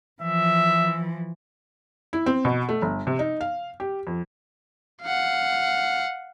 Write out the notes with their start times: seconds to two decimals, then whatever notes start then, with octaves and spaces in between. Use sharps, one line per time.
0.22 E3 F3 E5
2.13 E4
2.26 C4
2.45 B2
2.69 A3
2.82 G1
3.07 C3
3.19 D#4
3.41 F5
3.80 G4
4.07 F2
5.03 F5 F#5